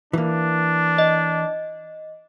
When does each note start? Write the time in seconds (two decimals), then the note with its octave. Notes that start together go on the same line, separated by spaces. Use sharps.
0.13 E3 A#3 D4
0.98 D#5